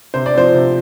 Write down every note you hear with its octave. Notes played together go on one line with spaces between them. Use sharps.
C3 C5
D5
F3 C4 C5
C3